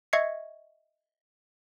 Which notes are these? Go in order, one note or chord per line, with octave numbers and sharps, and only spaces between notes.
D#5 E5 C#6 G#6 C7 C#7